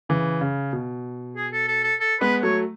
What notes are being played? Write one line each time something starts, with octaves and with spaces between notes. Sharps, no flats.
C#3 E3
C#3
B2
G#4
A4
A4
A4
A4
G#3 B3 B4
F#3 A3 C#5